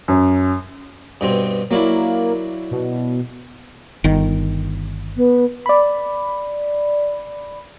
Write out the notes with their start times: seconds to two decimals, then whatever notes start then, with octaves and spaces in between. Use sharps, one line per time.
0.08 F#2
1.21 G2 B2 C4
1.71 F#3 A#3 D4 E4
2.71 B2
4.04 G1 D#3
5.17 B3
5.66 D5 B5